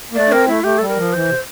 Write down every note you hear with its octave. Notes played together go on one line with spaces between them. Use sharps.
A#3
A3 D5
D4
C4 A#4
A3 E4
A3 G4
G3 A4
A#4
F3
E3 C5
C3